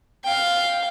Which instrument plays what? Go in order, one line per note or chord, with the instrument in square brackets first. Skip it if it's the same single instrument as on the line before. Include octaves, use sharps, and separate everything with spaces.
[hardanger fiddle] F5 G5